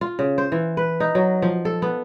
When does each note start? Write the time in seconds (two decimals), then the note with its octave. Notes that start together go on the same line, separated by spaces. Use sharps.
0.01 F4
0.19 C#3
0.38 C5
0.52 E3
0.77 B4
1.00 D#4
1.15 F#3
1.42 F3
1.65 A4
1.82 B3